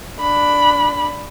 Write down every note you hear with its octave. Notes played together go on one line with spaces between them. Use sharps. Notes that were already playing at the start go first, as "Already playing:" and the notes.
D4 B5